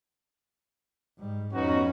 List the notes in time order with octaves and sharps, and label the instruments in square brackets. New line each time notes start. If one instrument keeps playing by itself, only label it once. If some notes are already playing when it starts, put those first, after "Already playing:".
[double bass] G#2 G3
[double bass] F2 C#4 [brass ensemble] B3 D#4 F#4